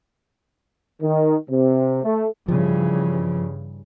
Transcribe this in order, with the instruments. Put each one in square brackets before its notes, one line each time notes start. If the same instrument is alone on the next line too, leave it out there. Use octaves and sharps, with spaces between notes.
[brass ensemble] D#3
C3
A3
[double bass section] G2 C#3 E3 [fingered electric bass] F3